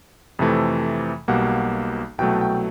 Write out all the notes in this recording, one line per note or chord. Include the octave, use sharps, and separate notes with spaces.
F2 C3 E3 A3
B1 B2 G3 A#3 F#5
C2 B2 F#3 A3 G5
G5